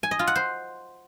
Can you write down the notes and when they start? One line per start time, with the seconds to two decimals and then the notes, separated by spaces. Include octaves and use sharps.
0.03 G#5
0.11 D#5
0.19 F4
0.27 F#5
0.36 C5